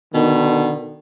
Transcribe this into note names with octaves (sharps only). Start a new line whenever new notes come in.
B2 D3 D#3